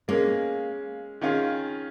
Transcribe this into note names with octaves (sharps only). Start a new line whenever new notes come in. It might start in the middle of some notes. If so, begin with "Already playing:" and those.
G#3 A#3 C#4 G#4
D#3 C#4 F4 G#4